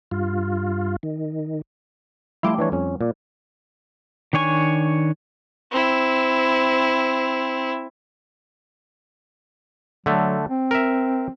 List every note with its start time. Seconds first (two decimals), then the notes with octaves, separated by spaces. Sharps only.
0.11 G2 F4
1.03 D#3
2.43 F3 G3 A3 E4
2.58 E3 D4 C#5
2.72 F2 C#4
3.01 A#2 D5
4.33 D#3 D4 C#5 G#5 C#6
5.71 C4 E4
10.06 D3 F#3 A3
10.50 C4
10.71 A#4 E5